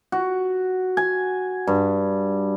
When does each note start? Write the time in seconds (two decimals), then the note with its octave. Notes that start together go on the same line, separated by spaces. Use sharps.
0.12 F#4
0.97 G#5
1.67 G2